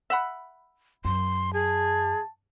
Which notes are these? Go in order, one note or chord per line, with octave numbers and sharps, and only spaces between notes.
E5 F#5 B5
F#2 C6
G#4 A5